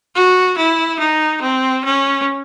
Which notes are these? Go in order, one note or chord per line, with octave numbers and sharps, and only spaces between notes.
F#4
E4
D#4
C4
C#4